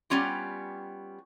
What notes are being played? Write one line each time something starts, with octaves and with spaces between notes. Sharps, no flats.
G3 B3 C#4 F4 G4